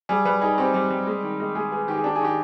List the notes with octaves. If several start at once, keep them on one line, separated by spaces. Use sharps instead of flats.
G3 G#4
G3 B4
D#4 G#4
C4 G4
G3
G3
G#3
D#3
G#3
G#3 G#4
B3 G#4
D#3 G4
G#4
D4 G4
G#4
D#3 G4